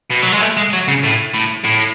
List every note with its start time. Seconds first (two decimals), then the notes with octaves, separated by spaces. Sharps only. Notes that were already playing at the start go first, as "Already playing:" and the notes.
0.11 B2
0.23 F#3
0.32 G#3
0.42 A3
0.57 G#3
0.73 F#3
0.88 C#3
1.04 A2
1.34 A2
1.65 A2